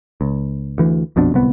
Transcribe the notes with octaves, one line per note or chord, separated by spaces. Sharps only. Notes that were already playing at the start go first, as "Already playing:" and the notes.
C#2
D2 E3
A#1 F2 B2 D4
D1 C2 B3